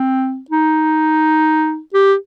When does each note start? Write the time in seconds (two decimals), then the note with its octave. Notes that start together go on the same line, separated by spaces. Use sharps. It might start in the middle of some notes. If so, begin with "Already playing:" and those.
Already playing: C4
0.50 D#4
1.94 G4